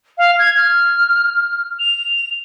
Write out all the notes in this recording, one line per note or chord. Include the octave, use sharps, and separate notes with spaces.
F5
G#6
F6
F7